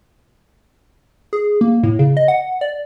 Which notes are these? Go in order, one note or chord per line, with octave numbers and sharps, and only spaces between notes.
G#4
A#3
A2
C#3
D#5
F#5
D5